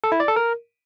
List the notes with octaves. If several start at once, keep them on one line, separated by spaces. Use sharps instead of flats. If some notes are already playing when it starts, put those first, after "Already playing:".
A4
E4
D5
A4
A#4